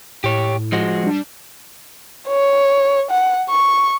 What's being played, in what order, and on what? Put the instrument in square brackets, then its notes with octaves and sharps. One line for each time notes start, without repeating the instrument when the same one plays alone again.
[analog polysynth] A2 [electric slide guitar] G4 C#5
[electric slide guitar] F3 G#3 F#4
[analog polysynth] G3 D4
[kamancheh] C#5
F#5
C#6